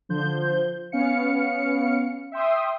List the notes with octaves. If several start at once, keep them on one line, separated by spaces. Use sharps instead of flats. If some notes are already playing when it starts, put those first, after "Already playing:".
D3 F3 C5 G6
B3 C#4 F5 C#7
E5 G5 C6 D#6